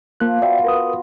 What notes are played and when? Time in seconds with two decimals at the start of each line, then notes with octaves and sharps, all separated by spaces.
0.20 F3 A#3 F#6
0.42 B3 F4 F#4 D5 E5 G5
0.64 A#4 B4 D#6